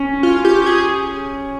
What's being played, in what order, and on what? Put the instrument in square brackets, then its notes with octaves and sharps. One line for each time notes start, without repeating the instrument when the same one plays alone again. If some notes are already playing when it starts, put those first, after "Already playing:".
Already playing: [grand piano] C#4
[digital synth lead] F4
G4
G4
G#4